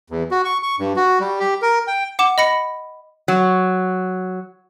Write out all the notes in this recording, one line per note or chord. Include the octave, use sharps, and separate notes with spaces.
E2
F#4
C#6
C#6
G2
F#4
G3
G4
A#4
G5
F#5 D6 E7
D#5 B5 A#6 C#7
F#3